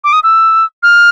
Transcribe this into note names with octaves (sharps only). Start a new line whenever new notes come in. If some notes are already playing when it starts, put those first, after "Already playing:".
D6
D#6
E6
F6